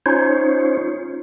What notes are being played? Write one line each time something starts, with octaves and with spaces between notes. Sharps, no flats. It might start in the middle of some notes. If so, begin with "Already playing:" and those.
C#4 D#4 F4 C5 C#5